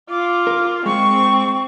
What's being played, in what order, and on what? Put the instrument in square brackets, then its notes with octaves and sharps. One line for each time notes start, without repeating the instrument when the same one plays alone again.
[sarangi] F4 [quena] D6
[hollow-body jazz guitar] A#4
[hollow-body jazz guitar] G#3 [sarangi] C4 [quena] C#6